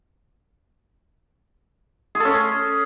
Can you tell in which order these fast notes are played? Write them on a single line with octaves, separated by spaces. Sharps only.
G#4 A4 C#4